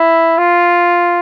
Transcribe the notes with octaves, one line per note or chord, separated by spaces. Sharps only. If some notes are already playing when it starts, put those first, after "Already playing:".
Already playing: E4
F4